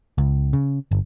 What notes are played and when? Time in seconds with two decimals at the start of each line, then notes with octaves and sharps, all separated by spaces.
0.18 C#2
0.53 C#3
0.91 G1